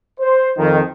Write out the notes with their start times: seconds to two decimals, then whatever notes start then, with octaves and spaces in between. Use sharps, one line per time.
0.20 C5
0.57 F2 D#3